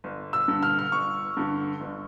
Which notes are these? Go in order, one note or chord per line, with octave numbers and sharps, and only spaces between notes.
G1
E6
G2 D3
F6
F6
G1 C#6
G2 D3
G1